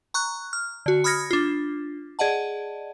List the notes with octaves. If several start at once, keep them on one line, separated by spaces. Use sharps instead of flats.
A#5 C#6 F#6
F6
D3 F#4
B5 D#6 F6 G#6 A#6 C#7
D4 F4
G#4 D5 D#5 F#5 A5